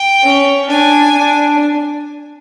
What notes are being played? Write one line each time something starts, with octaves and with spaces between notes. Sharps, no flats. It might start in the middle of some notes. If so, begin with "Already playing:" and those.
Already playing: G5
C#4
D4 G#5
D4